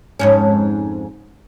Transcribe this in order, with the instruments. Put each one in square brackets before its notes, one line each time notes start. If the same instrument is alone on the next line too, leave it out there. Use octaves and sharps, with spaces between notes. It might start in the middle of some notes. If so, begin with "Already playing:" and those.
[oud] F2 G#2 C#4